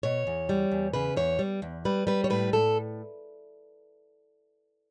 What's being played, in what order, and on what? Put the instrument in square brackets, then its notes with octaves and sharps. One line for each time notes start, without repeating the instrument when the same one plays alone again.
[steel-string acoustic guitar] B2 C#5
E2
G3
E2
C#3 B4
E2 C#5
G3
E2
G3 B4
G3 B4
C#5
A2 B4
A2 A4